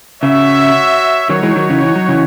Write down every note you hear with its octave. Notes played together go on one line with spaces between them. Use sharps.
C#3 F#4 C#5 E5
D#3 F#3 D#4 F#4 C#5
E3 G#3
D#3 F#3
C#3 E3
E3
F#3
C#3 E3